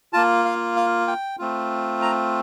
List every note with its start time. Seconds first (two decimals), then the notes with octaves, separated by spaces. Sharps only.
0.13 A#3 F4 A5
0.45 F5
0.76 F5
1.08 G5
1.39 A3 C4 F4
2.02 A#5